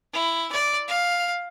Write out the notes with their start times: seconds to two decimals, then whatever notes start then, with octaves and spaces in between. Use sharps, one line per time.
0.13 E4
0.52 D5
0.88 F5